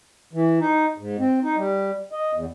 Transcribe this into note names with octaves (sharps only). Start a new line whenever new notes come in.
E3
D#4
G#2
C4
D#4
G3
D#5
E2